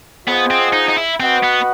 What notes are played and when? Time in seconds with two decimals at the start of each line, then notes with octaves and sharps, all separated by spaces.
0.26 B3 F4 G#4 C5 D#5 F#5
0.50 C4
0.73 D#4
0.89 D#4
0.97 E4
1.20 C4 F#4 B4 D#5 F#5
1.43 B3